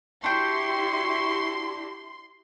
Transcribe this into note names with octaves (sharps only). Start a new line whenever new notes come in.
D4 E4 F#4 G4 G5 C6 C#6